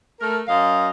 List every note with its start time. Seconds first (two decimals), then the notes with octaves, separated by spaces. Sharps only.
0.20 A3 A#4
0.48 F#2 D#5 F5